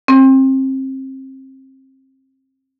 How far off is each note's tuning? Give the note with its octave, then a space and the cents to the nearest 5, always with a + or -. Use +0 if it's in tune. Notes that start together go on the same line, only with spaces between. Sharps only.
C4 +25